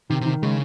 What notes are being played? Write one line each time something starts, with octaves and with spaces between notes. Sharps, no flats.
C3 D#3
C3 D#3
C#3 G#3